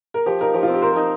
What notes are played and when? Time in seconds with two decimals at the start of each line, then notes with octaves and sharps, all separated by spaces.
0.14 A#4
0.26 F3 G4
0.41 D#4 A#4
0.54 F3 G4
0.63 F4
0.68 C4
0.73 G4
0.82 A#4 C5
0.92 A#4
0.96 D#4